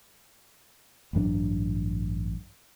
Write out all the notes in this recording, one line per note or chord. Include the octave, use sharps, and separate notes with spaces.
A1 G2 F#3 D4